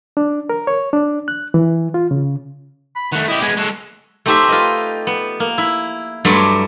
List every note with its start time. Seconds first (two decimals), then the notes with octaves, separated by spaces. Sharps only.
0.17 D4
0.49 A#4
0.67 C#5
0.93 D4
1.28 F#6
1.54 E3
1.94 F4
2.11 C#3
2.96 B5
3.12 D#3 A3 F#5
3.28 E4 G4 D#5
3.42 G#3 B3 G#5
3.57 G#3 F#4 A4
4.26 A3 C4 D#4 G4 C5 E5
4.48 F4 B4 D#5
5.07 B3
5.40 A#3
5.58 E4
6.25 G2 F#3 A3 D5 B5 C6